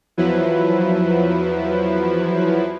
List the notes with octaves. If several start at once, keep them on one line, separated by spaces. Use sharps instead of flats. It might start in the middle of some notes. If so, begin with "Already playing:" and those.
E2 F3 F#3 E4 B4